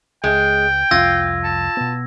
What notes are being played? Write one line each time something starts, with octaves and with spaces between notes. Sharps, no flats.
C#2 G#3 G5
C2 F2 F4 E6 G#6 A#6
A5
B2 B3